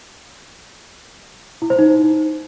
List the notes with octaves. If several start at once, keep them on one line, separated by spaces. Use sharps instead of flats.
E4
C5
D#4